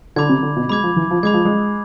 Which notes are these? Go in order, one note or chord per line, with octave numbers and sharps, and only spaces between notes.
D3 B5 D6 G#6
C3
D3
B2
G#3 B5 D6 G#6
F3
E3
F3
G#3 B5 D6 G#6
F3
G#3